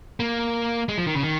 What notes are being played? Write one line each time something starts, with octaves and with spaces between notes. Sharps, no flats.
A#3
G#3
F3
D#3
C#3
D#3